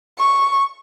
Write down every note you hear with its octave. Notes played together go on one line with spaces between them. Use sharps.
C#6